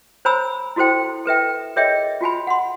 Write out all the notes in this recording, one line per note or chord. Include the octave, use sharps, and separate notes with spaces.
C5 C#5 G#5 A#5 B5 E6
E4 F#4 A4 C5 G5
A4 B4 E5 G5
G#4 A#4 C#5 D#5 E5 G5
F4 F#4 G#5 B5
F#5 C6